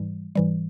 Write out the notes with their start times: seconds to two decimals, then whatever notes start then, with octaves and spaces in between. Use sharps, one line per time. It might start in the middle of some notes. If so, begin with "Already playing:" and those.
Already playing: G#2 E3 G3
0.35 G#2 E3 G3